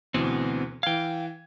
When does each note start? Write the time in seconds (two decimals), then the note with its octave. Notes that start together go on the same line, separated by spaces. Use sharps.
0.14 D2 B2 E3 B3 C4
0.83 E3 F5 G5 G#6